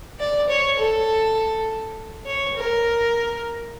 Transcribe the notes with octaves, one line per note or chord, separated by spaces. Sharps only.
D5
C#5
A4
C#5
A#4